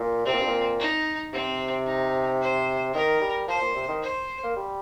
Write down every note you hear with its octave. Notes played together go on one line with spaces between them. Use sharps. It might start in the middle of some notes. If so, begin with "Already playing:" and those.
Already playing: A#2
C3 C4
A#2
G2
A#2
D#4
C3 C4
D#4
C5
D#3 A#4
G3
F3 C5
A#2
C3
D#3
C5
A#3
G3